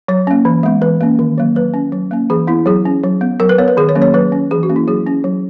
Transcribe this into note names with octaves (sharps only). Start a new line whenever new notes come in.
F#3 C#5
A#3 C#4
E3
G#3 B3
E3 B4
A#3 C#4
D#3
F#3 A#3
F#3 B4
C#4
F#3
A#3 C#4
E3 G#4
B3 E4
F#3 G#4
C#4
F#3
B3
F#3 A#4
B4
B3 C#5
B4
D#3 G#4
C#5
F#3 A#3 C#4
C#5
F#3 B4
C#4
E3 G#4
F#4
A#3 C#4
E4
F#3 G#4
C#4
F#3